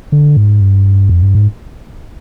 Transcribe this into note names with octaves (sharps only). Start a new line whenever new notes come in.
D3
G#2
G2
F2
G2
G#2